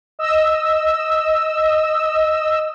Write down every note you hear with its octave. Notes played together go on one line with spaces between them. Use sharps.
D#5 E6